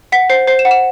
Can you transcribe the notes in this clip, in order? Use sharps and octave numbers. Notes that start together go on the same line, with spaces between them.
F#5 B6
C5 C7
C5 C7
E7
F#5
E7